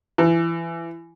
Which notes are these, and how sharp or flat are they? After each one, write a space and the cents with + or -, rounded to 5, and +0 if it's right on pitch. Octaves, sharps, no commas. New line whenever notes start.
E3 +25